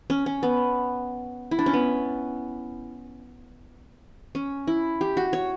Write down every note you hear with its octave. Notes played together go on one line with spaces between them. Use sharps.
C#4
C#4
B3
E4
D4
C#4
B3
C#4
E4
G4
F#4
C#5